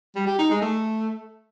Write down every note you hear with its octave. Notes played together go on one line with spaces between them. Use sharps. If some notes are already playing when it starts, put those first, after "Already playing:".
G3
G4
D#4
G#3
A3